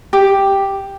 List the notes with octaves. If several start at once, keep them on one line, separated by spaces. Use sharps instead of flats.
G4